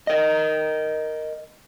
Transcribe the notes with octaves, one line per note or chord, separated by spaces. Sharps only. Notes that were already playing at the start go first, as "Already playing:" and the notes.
A#4 D#5